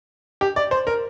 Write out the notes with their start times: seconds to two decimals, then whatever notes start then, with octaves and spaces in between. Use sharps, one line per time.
0.41 G4
0.56 D5
0.71 C5
0.87 A#4